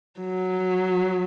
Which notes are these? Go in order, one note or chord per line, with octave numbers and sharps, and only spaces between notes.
F#3